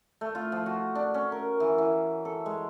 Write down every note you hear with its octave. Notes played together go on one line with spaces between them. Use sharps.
A3
F4
F3
F#4
D4
C#4
A#4
E3
E3
A4
G#3